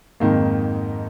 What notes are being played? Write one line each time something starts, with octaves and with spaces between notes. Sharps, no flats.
F2 G#2 D#3 A#3